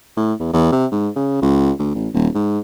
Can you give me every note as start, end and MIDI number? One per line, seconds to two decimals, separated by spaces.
0.17 0.33 45
0.40 0.49 40
0.53 0.70 40
0.72 0.86 48
0.91 1.08 44
1.16 1.40 49
1.42 1.71 37
1.79 1.93 38
1.94 2.08 33
2.14 2.28 27
2.35 2.59 44